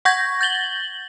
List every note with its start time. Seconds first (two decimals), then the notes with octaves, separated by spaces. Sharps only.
0.05 F#5 C#6 G6 G#6 A#6
0.41 G6 A6 F#7 G7